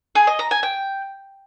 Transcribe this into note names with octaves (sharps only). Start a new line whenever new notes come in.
G#4
D#5
A#5
G#5
G5